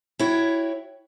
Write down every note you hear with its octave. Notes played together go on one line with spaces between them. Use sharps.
E4 F#4 C#5 G5